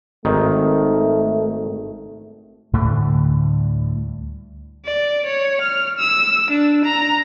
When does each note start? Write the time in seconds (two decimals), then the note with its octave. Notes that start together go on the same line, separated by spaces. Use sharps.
0.25 G#1 D#3 A3
2.73 D2 A2 D3 G3
4.85 D5
5.26 C#5
5.61 F6
5.99 E6
6.51 D4
6.85 A#5